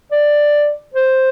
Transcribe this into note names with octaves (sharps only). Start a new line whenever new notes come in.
D5
C5